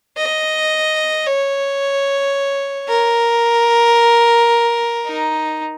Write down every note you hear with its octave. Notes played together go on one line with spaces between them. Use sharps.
D#5
C#5
A#4
D#4